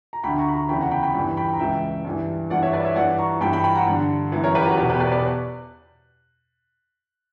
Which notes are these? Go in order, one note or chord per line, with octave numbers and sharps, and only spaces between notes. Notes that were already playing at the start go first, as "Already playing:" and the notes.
A#5
D2 D3 G5 B5
A#5 C#6
B5
A#5 C#6
E2 C#3 E3 G5 B5
F#5 A#5
G5 B5
G5 B5
G2 E3 G5 B5
G5 B5
A#5
C#2 C#3 E3 E5 G5
G2 E3
G2 E3 D5 F#5
C#5 E5
B4 D5
C#5 E5
G2 E3 D5 F#5
A#5 C#6
G2 E3 G5 B5
G5 B5
G5 B5
F#5 A#5
G2 D3
F#2 E3
A#4 C#5
G4 B4
F#4 A#4
E2 B2 F#4 A#4
G4 B4
B4 D5
B4 D5